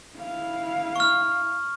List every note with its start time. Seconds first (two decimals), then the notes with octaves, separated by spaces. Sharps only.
0.17 E4 F5
0.96 C#6 F6